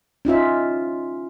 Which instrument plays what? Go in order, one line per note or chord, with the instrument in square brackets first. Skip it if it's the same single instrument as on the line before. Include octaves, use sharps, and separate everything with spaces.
[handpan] C#4 D#4 F4 E5